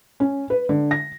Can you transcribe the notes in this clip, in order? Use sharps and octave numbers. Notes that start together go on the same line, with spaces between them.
C#4
B4
D3
A#6